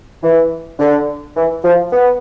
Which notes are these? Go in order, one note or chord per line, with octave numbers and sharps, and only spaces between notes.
E3
D3
E3
F3
B3